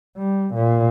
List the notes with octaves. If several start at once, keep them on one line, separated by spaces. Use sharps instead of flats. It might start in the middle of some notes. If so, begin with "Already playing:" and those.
G3
A#2